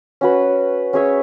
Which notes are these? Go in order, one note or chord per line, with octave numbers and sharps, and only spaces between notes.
C#4 F#4 B4
C#4 G#4 C#5 E5